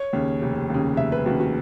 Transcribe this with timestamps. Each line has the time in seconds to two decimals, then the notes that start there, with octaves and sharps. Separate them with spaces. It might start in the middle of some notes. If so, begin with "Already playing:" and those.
Already playing: C#5
0.13 D#2 C#3
0.42 F1
0.70 D#2 C#3
0.97 F1 E5
1.12 B4
1.26 D#2 C#3 F#4
1.40 F#4